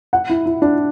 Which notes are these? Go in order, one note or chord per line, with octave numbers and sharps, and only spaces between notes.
F#5
E4
E4
D4